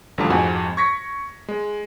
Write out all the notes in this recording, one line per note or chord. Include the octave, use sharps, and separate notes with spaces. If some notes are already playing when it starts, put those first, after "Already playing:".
A1 D3 G3 F4 A5
F2 G#2 F#4 F#5 G#5
C#6 G#6 A#6 B6 C#7
G#3